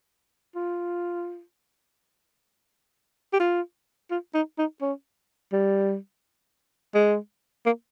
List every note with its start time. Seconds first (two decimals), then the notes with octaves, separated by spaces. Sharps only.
0.55 F4
3.33 G4
3.40 F4
4.11 F4
4.34 D#4
4.58 D#4
4.81 C#4
5.53 G3
6.95 G#3
7.66 A#3